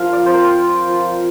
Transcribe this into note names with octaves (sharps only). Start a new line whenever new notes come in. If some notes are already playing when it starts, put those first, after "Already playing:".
Already playing: F3 F4 A#4 F5
D5
C4 C5
A#4
F4
F3